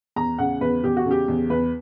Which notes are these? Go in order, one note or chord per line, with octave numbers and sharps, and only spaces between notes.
E2 A#5
C#3 F#5
E2 B4
E2 G4
F#4
C#3
G4
E2
E2 B4